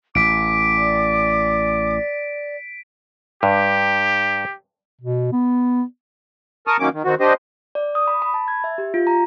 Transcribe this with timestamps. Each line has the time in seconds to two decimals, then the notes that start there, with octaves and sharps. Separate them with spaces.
0.15 A1 D6 B6 D7
0.77 D5
3.43 G2 G4
5.01 B2
5.32 B3
6.67 A#4 A5 C#6 D#6 F6
6.80 D#3 F#3 A#3 C#4 D6
6.94 D#3
7.05 D#3 C4 F#4
7.20 D4 G4 C5 D#5
7.75 D5
7.95 D#6
8.07 B5
8.22 B5
8.34 A5
8.48 G#6
8.64 E5
8.78 G4
8.94 F4
9.07 A#5